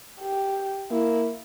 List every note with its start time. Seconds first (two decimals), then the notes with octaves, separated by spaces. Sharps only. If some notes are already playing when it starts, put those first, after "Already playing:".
0.21 G4
0.91 A#3 E4